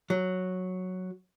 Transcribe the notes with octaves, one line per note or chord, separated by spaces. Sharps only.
F#3